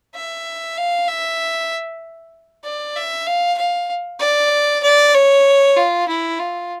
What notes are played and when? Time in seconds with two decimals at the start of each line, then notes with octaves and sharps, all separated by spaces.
0.15 E5
0.77 F5
1.08 E5
2.64 D5
2.96 E5
3.26 F5
3.58 F5
4.20 D5
4.83 D5
5.14 C#5
5.77 F4
6.08 E4
6.39 F4